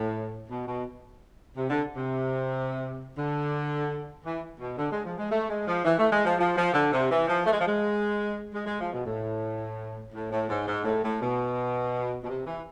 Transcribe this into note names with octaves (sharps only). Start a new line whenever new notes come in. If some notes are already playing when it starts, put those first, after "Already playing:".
Already playing: A2
B2
B2
C3
D3
C3
D3
E3
B2
D3
G#3
F3
G#3
A3
G#3
F3
E3
A3
G#3
F3
F3
F3
D3
C3
E3
F3
A3
G#3
F3
G#3
G#3
G#3
F3
B2
A2
A2
A2
G#2
G#2
A2
A2
B2
B2
C3
E3